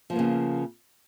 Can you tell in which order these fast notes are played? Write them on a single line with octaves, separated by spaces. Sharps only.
F3 B3 A#3 C#3